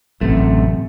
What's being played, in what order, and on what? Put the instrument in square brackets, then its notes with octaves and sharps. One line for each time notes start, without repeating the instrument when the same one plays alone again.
[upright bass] A1 [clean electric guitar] F#2 C3 A3